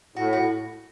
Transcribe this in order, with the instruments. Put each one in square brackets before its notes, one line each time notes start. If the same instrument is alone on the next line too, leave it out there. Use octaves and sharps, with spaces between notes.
[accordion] A2 [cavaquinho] F#4
[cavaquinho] F#4